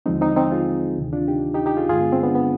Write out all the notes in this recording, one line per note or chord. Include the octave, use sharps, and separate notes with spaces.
D#2 D3 F3 G#3 C4 D#4
C4 D#4
C4 D#4
F4 G#4
D2 C3 D#3
D4 F4
D#4 G4
D#4 G4
D#4 G4
F4 G#4
G2 D3 G#3 F4 G#4
B3
C4
B3 D4
B3